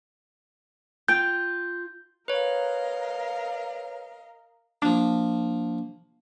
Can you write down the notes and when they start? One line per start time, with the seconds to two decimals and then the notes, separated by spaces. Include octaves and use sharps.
1.08 F4 G5 G6
2.28 A#4 B4 C#5 D#5 F5
4.82 F3 A#3 D4